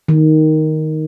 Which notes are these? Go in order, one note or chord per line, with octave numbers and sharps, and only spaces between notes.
D#3